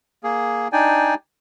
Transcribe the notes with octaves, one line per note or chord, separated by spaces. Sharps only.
A#3 G#4
D4 D#4 D5 G5 G#5